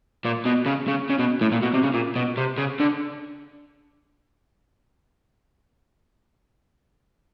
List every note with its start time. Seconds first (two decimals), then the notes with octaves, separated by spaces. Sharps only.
0.25 A#2
0.46 B2
0.66 C#3
0.88 C#3
1.10 C#3
1.19 B2
1.41 A2
1.52 A#2
1.63 B2
1.74 C3
1.83 C#3
1.94 A#2
2.16 B2
2.37 C3
2.58 C#3
2.80 D3